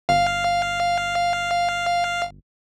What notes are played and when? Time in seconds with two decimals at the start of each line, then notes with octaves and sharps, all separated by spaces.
0.09 G1 F5